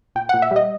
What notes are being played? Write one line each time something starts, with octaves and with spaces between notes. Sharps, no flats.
A#2 G5
A#2 F#5
E5
G3 D#5